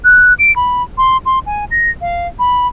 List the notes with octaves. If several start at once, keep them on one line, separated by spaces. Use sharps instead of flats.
F#6
D7
B5
C6
C6
G#5
A#6
F5
B5